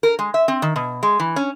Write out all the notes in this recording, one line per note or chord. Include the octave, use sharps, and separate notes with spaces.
A#4
G#3
E5
C4
D#3
B2
G#3
E3
C#4